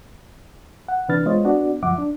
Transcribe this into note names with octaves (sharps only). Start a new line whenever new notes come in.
F#5
C3 E3 D4 B4 F6 A6
G#3 B3 F4 C5 C#5 D#5
B3 D4 F#4 D5
C#2 F#2 F3 E5 F#5 D6
D4